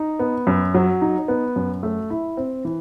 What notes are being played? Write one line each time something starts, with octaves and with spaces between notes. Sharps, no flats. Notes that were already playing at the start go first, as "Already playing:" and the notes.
Already playing: D#4
B3
F#2
F#3
D#4
B3
F#2
A3
E4
C4
E3